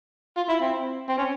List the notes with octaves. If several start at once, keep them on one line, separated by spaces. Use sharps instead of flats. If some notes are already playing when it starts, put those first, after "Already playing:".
F4
E4
C4
C4
C#4